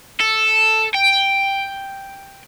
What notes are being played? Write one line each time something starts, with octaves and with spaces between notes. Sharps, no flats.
A4
G5